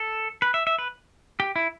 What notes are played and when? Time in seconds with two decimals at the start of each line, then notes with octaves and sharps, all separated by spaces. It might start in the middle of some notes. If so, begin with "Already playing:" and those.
Already playing: A4
0.42 B4
0.54 E5
0.67 E5
0.79 B4
1.40 G4
1.56 E4